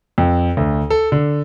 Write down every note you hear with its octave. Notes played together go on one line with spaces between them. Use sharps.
F2
D2
A4
D3